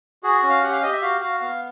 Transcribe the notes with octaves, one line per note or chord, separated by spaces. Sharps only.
F#4 G#4
C#4
F5
G4 F#5
F5
G4 D#5
E5
F#4 F5
F#4 F5
B3 F5